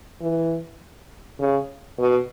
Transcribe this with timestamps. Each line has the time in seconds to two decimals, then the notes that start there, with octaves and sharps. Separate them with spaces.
0.21 E3
1.40 C#3
1.99 B2